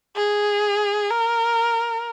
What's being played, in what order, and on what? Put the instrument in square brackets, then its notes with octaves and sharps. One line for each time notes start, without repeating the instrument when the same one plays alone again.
[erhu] G#4
A#4